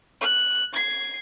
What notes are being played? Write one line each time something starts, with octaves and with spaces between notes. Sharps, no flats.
F#6
G#6 C7